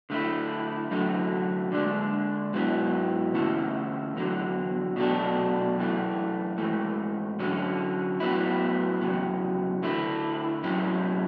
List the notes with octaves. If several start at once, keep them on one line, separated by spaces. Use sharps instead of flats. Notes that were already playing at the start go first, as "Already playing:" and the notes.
D3 A3 E4
F#2 D3 F#3 A3
D3 G#3 D4
G#2 F#3 B3 E4
D3 A3 C#4 E4
E2 D3 F#3
B2 F#3 A3 D4
F#2 E3 A3
G#2 E3 A3
D3 F#3 C#4
A2 F#3 B3 E4
E2 C#3 F#3
D3 A3 E4
A2 F#3 C#4 E4